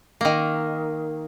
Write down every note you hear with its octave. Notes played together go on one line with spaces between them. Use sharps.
D#3 A#3